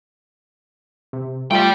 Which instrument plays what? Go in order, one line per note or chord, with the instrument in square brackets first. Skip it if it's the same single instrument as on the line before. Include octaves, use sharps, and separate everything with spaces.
[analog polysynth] C3
[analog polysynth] G3 A3 F4 [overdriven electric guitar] D5 G5